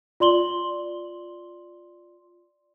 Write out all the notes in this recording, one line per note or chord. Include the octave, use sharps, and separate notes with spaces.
F4 D5 C6 F#7 G7